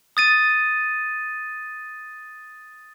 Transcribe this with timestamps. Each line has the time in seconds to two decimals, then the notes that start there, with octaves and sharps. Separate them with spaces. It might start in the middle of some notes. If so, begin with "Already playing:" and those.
0.17 D#6 A6 D#7